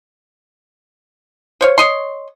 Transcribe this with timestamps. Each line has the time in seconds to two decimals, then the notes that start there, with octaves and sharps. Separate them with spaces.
1.61 C5 C#5 F5
1.78 C#5 D#5 C6